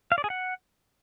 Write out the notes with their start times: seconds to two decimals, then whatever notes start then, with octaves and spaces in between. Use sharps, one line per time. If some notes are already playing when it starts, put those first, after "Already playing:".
0.12 F5
0.18 D5
0.24 G#4
0.30 F#5